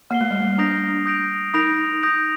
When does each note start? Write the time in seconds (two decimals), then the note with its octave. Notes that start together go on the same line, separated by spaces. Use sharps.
0.10 A#3 F6 C7 G7
0.21 A3
0.31 G3
0.40 A3
0.58 D4 D#6 G6 A#6 D7 F7
1.06 D#6 G6 A#6 D7 F7
1.54 D#4 D#6 G6 A#6 D7 F7
2.03 D#6 G6 A#6 D7 F7